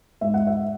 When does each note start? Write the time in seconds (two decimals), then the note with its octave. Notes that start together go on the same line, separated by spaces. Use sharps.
0.21 G#2 E5
0.34 F#5
0.47 E5